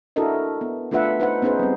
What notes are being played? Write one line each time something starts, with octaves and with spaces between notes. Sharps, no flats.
D4 E4 F#4 A4 A#4 D#5
B3
A3 D4 F4 B4 E5 F#5
D#4 B4 C5 F#5
B3 C#4 D#4 G#4 B4 C5
G3 C4